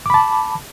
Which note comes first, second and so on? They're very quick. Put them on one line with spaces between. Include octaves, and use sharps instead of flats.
D6 B5 A5